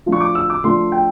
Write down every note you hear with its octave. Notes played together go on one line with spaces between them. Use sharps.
F3 A3 D4 F4
C#6
D6
E6
D6
F3 A3 D4 F4 C6
G5